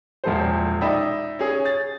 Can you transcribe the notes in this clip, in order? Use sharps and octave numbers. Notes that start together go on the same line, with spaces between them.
E1 A#2 F3 E4 A4 C5
D#4 D5 E5 G5 B5
C#4 G#4
A6